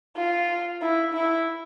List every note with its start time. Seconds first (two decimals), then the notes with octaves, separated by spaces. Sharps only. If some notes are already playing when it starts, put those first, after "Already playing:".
0.17 F4
0.82 E4
1.14 E4